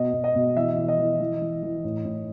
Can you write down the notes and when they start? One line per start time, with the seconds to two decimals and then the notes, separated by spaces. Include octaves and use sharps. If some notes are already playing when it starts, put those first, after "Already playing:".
Already playing: B2 D#5
0.13 B2
0.24 D#5
0.35 B2
0.56 E3 E5
0.77 E3
0.88 D#5
0.98 E3
1.20 E3
1.42 E3
1.63 E3
1.84 A2
2.05 A2